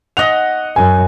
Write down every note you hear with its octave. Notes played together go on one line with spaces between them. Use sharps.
D#5 F#5 F7
F#2 G#5